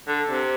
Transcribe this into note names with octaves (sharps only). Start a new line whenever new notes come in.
D3
C3